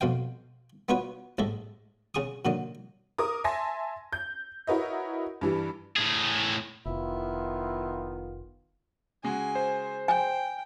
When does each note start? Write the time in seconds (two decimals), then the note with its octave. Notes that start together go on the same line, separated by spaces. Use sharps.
0.01 F2 B2 F5 G5
0.89 B3 D#4 F4 F#4 B4 C#5
1.38 A1 G#2 A4 E5
2.15 C#3 G#4 C#6 D#6
2.45 A#2 D3 F#3 D#4
3.18 A#4 D6 D#6
3.44 E5 G#5 A5 C6 A#6
4.13 G6
4.67 E4 F#4 A#4 B4 C#5 D#5
5.41 G2 E3 G3
5.96 A2 G#4
6.86 F1 D#3 B3 E4 F4
9.24 C#3 G#3 F#4 G#5
9.55 C5
10.08 G5 G#5